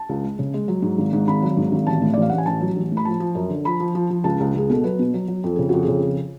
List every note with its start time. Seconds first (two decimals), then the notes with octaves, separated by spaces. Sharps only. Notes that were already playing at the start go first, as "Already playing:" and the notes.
Already playing: A5
0.09 C#2
0.24 G#3
0.39 C#3
0.54 G#3
0.68 F#3
0.82 G#2
0.98 G#1
1.13 G#2
1.28 G#1 B5
1.42 F#3
1.57 G#2
1.72 G#1
1.87 A1 A5
2.02 A2
2.14 A1 D5
2.22 F5
2.29 A1 F#5
2.38 G#5
2.46 A1 A5
2.61 F#3
2.76 A1
2.92 A2
2.97 B5
3.05 F3 A5
3.20 F3
3.35 F#2
3.50 D3
3.65 F3 B5
3.80 F3
3.95 F3
4.10 F3
4.24 C#2 A5
4.40 C#2
4.55 C#2 G#4
4.70 B2 A4
4.84 F#3 B4
4.99 B2
5.14 F#3
5.28 F#3
5.44 F2 A4
5.56 C#3 G#4
5.69 F2 F#4
5.83 G#4
5.88 C#3
6.03 F2